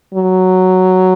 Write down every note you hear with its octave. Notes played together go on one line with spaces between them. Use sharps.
F#3